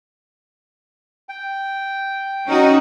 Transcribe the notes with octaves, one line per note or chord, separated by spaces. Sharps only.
G5
C#4 D#4 F#4